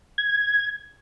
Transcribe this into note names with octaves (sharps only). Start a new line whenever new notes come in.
G#6